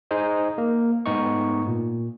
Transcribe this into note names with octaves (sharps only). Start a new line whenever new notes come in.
D#4 G#4 C5 D#5
A#3
G#2 A3 B3 D#4 D#5 C#6
A#2